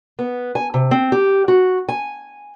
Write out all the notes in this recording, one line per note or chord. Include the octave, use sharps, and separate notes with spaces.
B3
G#5
C3
C4
G4
F#4
G#5